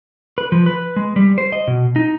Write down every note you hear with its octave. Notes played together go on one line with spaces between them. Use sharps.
B4
F3
B4
G#3
G3
C5
D#5
B2
D#4